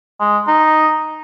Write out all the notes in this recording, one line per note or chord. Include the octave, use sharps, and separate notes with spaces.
G#3
D#4